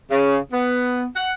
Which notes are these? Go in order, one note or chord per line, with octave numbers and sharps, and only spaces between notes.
C#3
B3
F#5